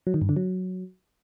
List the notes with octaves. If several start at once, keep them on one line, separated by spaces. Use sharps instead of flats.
F#3
D#3
G2
D3
F#3